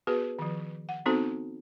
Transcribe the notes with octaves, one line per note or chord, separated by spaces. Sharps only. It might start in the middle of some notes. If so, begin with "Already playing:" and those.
B3 F#4 G#4 B4
D#3 F3
F#5
B3 C4 D#4 F#4 A4 C5